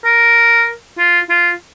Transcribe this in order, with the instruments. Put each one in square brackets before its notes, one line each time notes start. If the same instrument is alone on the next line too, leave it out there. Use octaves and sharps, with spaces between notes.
[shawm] A#4
F4
F4